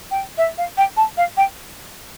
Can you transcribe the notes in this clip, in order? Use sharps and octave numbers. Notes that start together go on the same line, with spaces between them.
G5
E5
F5
G5
A5
F5
G5